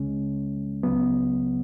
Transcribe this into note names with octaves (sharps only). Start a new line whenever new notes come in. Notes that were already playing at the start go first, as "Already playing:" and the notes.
Already playing: C#2 C#3 G#3 C#4
C#2 C#3 F#3 B3